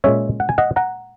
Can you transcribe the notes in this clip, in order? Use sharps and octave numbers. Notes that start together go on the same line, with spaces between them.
A#2 G#3 C#4 C#5 E5
F#5
G#5
D#5 F#5
F#5 A#5